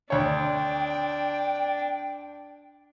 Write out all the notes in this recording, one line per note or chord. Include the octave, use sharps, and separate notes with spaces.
D2 D4 C#5 G5